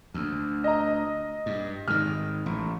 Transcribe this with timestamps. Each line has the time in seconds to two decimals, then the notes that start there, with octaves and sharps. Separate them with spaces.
0.14 D2
0.64 D#5 A#5
1.46 G2
1.88 G#2 D#3 F6
2.46 A1